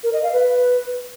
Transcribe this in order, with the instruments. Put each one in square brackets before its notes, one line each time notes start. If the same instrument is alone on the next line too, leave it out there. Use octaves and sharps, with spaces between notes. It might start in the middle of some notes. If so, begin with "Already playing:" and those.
[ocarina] A#4
D#5
F5
B4